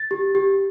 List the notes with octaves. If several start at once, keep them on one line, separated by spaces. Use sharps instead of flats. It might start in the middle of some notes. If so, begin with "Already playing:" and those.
Already playing: A6
G4
G4